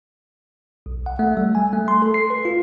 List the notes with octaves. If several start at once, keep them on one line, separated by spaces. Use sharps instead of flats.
B1
F#5
A3
G3
G#5
A3
C6
A4
C7
B4
F4